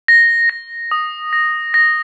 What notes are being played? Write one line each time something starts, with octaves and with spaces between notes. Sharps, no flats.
A#6
A#6
D#6
A#6
A#6